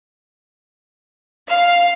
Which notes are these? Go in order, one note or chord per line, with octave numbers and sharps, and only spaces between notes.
F5